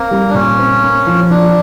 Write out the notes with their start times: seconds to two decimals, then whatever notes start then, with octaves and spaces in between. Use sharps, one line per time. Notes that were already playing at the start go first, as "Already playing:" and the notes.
Already playing: A#3 C4
0.11 G3
0.30 D4
0.34 A#2 C#4
0.59 C4
0.82 A#3
1.06 F3
1.30 F3 D4